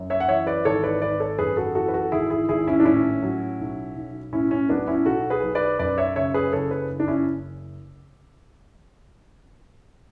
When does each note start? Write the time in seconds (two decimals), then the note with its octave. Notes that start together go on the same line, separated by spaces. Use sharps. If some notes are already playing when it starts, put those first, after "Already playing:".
Already playing: F#2
0.10 C#5 E5
0.20 F#5
0.28 E3 C#5 E5
0.47 B4 D5
0.65 G#1 A4 C#5
0.83 B4 D5
1.02 G#1 B4 D5
1.20 A4 C#5
1.38 F#2 G#4 B4
1.57 F#4 A4
1.75 E3 F#4 A4
1.88 B4
1.94 F#4 A4
2.12 G#1 E4 G#4
2.30 E4 G#4
2.49 G#1 E4 G#4
2.67 C#4 E4
2.80 D4
2.85 A2 C#4 E4
3.22 F#3
3.59 B1
3.96 B1
4.32 A2 C#4 E4
4.51 C#4
4.69 F#3 B3 D4
4.87 C#4 E4
5.05 B1 F#4 A4
5.30 G#4 B4
5.43 B1
5.55 B4 D5
5.79 F#2 B4 D5
5.98 C#5 E5
6.16 C#3 C#5 E5
6.34 G#4 B4
6.53 F#1 A4 C#5
6.71 G#4 B4
6.90 F#1
7.00 D4
7.08 C#4 E4